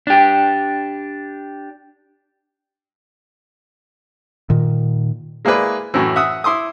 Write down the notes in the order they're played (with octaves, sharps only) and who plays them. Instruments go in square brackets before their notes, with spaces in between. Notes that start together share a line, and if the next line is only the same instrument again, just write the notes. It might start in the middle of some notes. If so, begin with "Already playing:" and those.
[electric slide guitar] D4 G4
[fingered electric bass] A#2 D#3
[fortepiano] G#3 A#3 E4 G#4 B4 D5
F#2 A2 E3
E5 F#5 D#6
E4 C6 D6 D#6